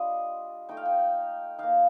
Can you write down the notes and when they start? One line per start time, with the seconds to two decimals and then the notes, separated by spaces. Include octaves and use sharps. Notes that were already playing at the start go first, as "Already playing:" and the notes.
Already playing: G3 D4 F4 D#5
0.69 A3 D#4 G5
0.77 F5
0.85 G5
1.58 A#3 D#4 F5